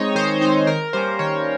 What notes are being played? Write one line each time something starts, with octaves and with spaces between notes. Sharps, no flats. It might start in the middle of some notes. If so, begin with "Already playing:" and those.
Already playing: G#3 C4 D#4 C#5 D#5
D#3 C5
G#3 C4 D#4 C5
D#3 A#4
G3 A#3 C#4 C5
D#3 C#5